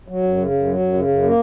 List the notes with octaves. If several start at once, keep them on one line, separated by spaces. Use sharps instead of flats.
F#3
F#2
C#3
F#2
F#3
F#2
C#3
F#2
A#3